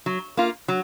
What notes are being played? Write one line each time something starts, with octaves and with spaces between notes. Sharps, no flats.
F#3
A#3 F4
F#3